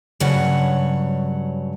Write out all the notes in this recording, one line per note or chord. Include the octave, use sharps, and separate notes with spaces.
G2 C#3 F#3 C#5 F#5